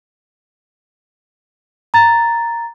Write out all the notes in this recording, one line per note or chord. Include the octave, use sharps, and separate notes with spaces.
A#5 A6